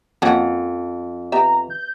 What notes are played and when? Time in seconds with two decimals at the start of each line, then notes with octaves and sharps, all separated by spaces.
0.22 F2 A#3 C#4 F#4
1.32 B3 G4 E5 A#5
1.70 G6